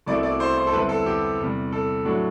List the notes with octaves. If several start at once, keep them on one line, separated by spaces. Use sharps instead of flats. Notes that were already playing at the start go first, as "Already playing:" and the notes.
C2 B2 A3 C4 E4 D5
D5
C5
C5
A4
E2 D3 G3 C4 E4 B4
A4
G4
E2 C3 G3
A4
A2 F#3 A3 D4